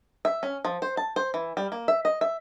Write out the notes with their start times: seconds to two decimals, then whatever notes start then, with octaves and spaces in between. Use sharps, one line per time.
0.25 E5
0.43 C#4
0.65 F3
0.82 C5
0.97 A5
1.16 C5
1.34 E3
1.57 G3
1.72 A#3
1.88 E5
2.05 D#5
2.21 E5